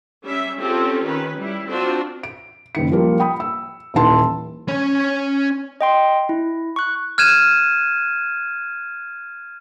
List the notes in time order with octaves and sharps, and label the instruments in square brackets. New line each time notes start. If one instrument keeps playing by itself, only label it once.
[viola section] G3 C#4 E5
C4 C#4 F4 G4 A4
D#3 C#4 B4
G3 E4
C4 D4 F4 F#4 C5
[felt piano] D7
F#1 D#3 C#7
F3 G3 A#3 F4
G5 B5 D#6
E6
D#1 E3 D#4 A5 C6
[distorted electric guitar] C#4 C#5
[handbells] D#5 G5 C6
E4
C#6 F#6
[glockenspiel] F6 F#6 G#6 D#7 E7